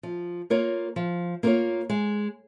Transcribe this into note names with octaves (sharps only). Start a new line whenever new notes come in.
F3
A#3 F4 A#4 C#5
F3
A#3 F4 A#4 C#5
G#3